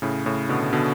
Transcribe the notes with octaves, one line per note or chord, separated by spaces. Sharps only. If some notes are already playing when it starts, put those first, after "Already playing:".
A2 C#3
A2 C#3
B2 D3
B2 D3